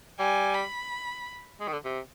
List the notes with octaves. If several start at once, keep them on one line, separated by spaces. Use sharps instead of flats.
G3 G#5
B5
G#3
D#3
D3
C3